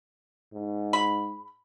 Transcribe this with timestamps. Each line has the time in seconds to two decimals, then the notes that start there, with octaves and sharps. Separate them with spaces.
0.53 G#2
0.93 B5